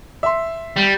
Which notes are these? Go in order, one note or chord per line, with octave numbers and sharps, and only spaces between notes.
E5 C6
G3